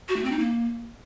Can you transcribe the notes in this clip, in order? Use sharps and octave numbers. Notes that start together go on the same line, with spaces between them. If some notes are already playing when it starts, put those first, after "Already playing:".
F#4
A3
C4
D#4
A#3